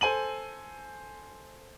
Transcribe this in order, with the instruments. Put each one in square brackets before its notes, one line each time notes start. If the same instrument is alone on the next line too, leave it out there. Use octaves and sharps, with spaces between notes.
[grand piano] A4 C5 G#5 D#7 F#7